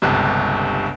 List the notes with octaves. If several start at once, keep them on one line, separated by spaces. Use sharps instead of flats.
G1 C#2 G2 C3